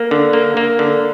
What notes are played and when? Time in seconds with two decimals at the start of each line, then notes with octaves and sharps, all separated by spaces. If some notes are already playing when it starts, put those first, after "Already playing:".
Already playing: A#3
0.11 D3
0.33 A#3
0.57 A#3
0.79 D3